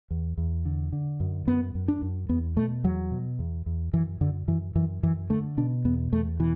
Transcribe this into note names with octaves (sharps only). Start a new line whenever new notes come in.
E2
E2
D3
D3
F#2
F#2 B3
F#2
D4
F#2
E2 B3
B2 A3
E2 F#3
B2
E2
E2
F#2 E3
F#2 D3
F#2 E3
F#2 E3
F#2 E3
D3 A3
B2 D4
E2 B3
E2 A3
B2 E3